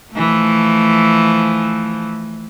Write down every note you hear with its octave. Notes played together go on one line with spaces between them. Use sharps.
E3 F3 A3